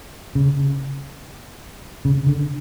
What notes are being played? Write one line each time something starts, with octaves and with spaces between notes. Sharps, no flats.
C#3
C#3
D3